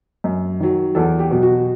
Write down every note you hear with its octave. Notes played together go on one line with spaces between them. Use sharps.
F#2
D#3 F#3
E2 A4
G4
B2 F#3
F#4